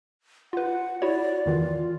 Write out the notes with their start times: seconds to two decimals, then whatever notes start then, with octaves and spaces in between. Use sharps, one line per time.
0.53 F4 B4 F#5
1.02 E4 F#4 C#5 D5
1.46 E2 D#3 E3 F4